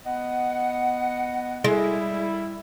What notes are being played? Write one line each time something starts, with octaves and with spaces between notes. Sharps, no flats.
B3 D#5 F#5
G3 G#3 E4